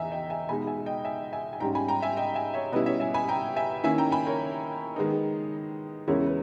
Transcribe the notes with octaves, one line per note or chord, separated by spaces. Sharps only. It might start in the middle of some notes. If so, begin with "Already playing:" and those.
Already playing: E2 E3 D#5 E5 G#5 A#5
D#5 G5
E5 G#5
B2 G#3 D#4 G#5 B5
E5 G#5
D#5 G5
E5 G#5
E5 G#5
G#5
G#2 G3 C#4 G5 A#5
G#5 B5
G5 A#5
E5 G#5
D#5 G5
E5 G#5
C#5 E5
B2 G3 C#4 E4 B4 D#5
C#5 E5
E5 G#5
G#5 B5
G5 A#5
E5 G#5
D#3 A#3 C#4 E4 E5 G#5
G5 A#5
G#5 B5
A#4 C#5
D#3 G#3 B3 D#4
E2 C#3 G#3 C#4 E4 A#4 C#5
B4